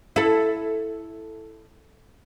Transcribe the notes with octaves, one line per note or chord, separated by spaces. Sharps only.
E4 A4